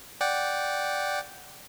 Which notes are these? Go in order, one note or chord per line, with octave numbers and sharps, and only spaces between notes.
D5 F#5 G5